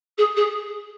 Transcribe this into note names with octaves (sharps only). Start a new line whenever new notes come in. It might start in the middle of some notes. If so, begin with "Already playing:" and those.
G#4
G#4